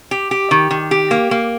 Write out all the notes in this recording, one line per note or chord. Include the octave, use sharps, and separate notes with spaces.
G4
G4
D#3
D#3
G4
A#3
A#3